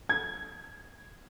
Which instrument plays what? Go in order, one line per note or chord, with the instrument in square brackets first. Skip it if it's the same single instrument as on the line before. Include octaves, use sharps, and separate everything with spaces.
[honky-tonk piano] G#6